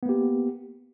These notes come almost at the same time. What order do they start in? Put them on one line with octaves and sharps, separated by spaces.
B3 A#3 G4